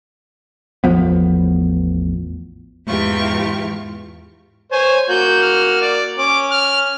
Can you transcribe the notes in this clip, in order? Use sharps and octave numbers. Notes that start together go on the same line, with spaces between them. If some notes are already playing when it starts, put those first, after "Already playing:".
A1 E2 F3 B3
E2 G#2 E3 F4 G4 C#6
C5 C#5 G#5
A#3 F#4 G6
F6
D5
C#4 D6
F6